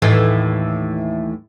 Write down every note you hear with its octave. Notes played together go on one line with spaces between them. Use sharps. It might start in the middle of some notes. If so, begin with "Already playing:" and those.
D#2 A2 E3